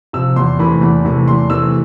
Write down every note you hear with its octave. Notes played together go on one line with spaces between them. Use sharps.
C3 F3 E6
E2 C6
C3 E3 A3 B5
E2
C3 E3 A3
E2 C6
C3 E3 A3 E6